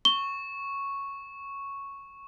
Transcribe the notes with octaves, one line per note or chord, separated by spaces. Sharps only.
C#6 G7